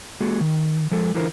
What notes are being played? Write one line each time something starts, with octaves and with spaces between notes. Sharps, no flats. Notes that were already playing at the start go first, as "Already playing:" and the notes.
G#3 A#3 F#4 G#4 A4
D#3
F3 G#3 A4
D3 E3 E4 F4 A#4 C5